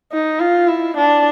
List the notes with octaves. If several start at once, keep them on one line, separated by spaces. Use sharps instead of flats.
D#4
F4
E4
D4